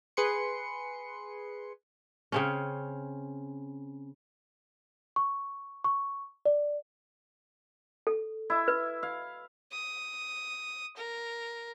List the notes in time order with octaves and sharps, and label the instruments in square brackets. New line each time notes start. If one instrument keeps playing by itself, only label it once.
[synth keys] G#4 B4 C6 C#7
[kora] C#3 C4 C#4
[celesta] C#6
C#6
D5
[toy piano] A4
[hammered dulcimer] E4 E5
[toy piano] B4
[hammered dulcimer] F5
[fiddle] D#6
A#4